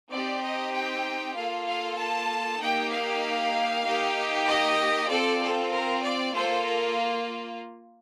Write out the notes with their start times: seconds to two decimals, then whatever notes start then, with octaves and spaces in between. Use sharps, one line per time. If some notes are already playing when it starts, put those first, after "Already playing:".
0.11 C4 D#4 G4 D5
0.42 D#5
0.73 G5
1.35 A#3 F4 A4 F5
1.67 F5
1.98 A5
2.60 A#3 D#4 G4 G5
2.91 F5
3.85 A#3 D#4 G4
4.47 D#5
5.09 C4 F4 A4 D5
5.41 A4
5.71 A#4
6.03 D5
6.34 A#3 F4 A4 C5
6.65 A#4